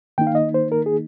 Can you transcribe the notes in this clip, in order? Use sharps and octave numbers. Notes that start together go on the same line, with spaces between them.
D#3 A#3 D#4 G5
F5
D#5
C5
A#4
G#4